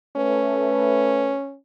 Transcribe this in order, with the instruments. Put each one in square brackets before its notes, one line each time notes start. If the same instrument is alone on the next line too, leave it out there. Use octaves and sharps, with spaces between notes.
[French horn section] A3 B4 [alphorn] C#4